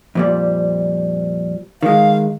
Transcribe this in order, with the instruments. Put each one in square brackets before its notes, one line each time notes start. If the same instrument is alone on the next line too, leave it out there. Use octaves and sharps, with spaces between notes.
[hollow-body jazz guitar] F2 A#2 G3
[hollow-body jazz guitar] D#3 G#3 [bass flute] F5